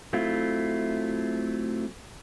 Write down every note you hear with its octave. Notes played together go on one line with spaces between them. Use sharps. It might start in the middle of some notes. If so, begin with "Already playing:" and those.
F#3 A3 C4 E4 F4